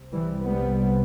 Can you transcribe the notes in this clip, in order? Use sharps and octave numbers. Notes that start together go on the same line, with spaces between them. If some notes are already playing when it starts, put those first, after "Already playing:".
Already playing: C2 C3
E3 G3
G3 B3